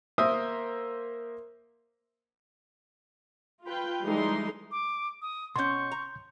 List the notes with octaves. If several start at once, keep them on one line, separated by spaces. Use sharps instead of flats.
A#3 A#4 C5 E5 D#6
F4 B4 G5
E3 G3 G#3 D#4 A4 C6
D6
D#6
B2 C#4 C6 C#6 G6
A#5